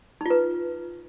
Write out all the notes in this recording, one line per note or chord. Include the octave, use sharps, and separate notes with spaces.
D#4 F4 B4